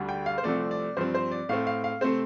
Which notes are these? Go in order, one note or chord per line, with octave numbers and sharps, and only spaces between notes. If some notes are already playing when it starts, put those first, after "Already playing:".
Already playing: D2 D3 G3
G5
F5
C5
C2 C3 F3 A3 C4 D5
D5
G2 F3 C4 C5
C5
D5
A2 A3 C4 F5
F5
F5
C3 A3 C4 C5